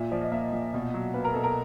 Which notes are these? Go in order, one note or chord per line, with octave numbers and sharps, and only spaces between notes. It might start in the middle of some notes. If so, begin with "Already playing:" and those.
Already playing: A#2 E5
F3 D5
D#5
A#3 E5
A#2
B2
F#3
A#3 B4
A#4
B2 A4
A#4